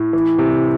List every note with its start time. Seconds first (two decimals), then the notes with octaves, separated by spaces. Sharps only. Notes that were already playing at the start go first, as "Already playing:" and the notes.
Already playing: A2
0.13 E3
0.38 C3